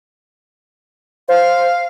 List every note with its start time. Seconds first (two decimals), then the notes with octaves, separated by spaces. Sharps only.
1.28 C5 F5